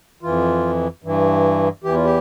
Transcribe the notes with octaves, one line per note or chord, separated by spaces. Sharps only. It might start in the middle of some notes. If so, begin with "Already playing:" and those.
F2 E3 F4
G2 E3
E2 E3 G4
F4
G4